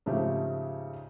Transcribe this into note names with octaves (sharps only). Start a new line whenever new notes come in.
G#2 C#3 F3 A3 C4 G4